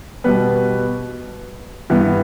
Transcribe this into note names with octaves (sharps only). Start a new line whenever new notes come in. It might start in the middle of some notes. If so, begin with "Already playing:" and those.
B2 G3 B3 B4
G2 E3 B3